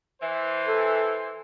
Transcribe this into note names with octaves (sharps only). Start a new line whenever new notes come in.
E3 C5
A4